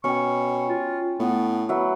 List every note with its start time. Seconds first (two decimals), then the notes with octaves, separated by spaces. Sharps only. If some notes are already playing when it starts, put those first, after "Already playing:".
0.04 B2 C#4 G5 C#6
0.68 F4
1.19 A2 B3
1.69 F#3 B4 E5